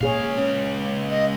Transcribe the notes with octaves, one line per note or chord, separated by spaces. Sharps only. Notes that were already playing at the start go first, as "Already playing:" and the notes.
C#2 A#2 G#4 C#5 F5
C#3
D#5